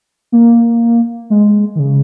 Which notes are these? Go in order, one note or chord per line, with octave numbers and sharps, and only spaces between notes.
A#3
G#3
D#3
C#3